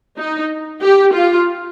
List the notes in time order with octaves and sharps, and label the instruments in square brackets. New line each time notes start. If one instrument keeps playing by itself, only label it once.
[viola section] D#4
G4
F4